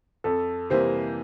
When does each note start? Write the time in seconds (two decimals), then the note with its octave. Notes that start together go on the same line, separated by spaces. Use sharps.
0.24 F2 A4
0.70 C3 E3 G3 A#3 C5